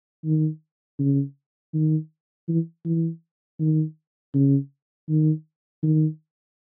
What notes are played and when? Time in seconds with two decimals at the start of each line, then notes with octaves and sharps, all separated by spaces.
0.25 D#3
0.99 C#3
1.74 D#3
2.48 E3
2.85 E3
3.60 D#3
4.34 C#3
5.09 D#3
5.83 D#3